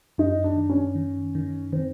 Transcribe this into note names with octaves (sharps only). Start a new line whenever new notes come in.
F#2 D#4
D4
D#3
C#4
D#3
D#3
D#3 C4